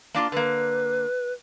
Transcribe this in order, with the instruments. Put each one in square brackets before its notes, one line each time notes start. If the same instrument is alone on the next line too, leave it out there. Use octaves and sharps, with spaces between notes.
[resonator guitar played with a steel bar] A#3 D4 F4
[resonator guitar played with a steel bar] D3 A#3 [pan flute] B4